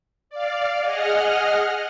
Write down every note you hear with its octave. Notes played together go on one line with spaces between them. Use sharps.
D5 F5
G#4 D#5 F#5 F6